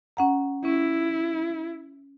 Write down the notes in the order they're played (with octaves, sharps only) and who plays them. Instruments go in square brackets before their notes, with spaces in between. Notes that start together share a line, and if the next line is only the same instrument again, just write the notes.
[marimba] C#4 F#5 A#5
[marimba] C#4 [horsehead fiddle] E4